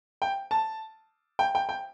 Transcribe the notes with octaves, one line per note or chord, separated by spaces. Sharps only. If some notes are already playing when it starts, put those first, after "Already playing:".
G5
A5
G5
G5
G5